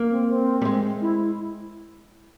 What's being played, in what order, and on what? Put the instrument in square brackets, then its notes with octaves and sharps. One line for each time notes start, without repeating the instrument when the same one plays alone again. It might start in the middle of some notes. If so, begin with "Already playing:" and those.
Already playing: [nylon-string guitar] A#3
[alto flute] C4
C4
[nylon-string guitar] G3
G#3
[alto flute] E4